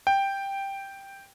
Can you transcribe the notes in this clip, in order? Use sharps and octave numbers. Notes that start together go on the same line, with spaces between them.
G5